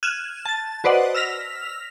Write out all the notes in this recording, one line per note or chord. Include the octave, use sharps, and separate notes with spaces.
F6 F#6 G#6 D#7 E7
A5 A6
F#4 B4 C5 D5 D#5 F#5
E6 F6 A#6 B6 F7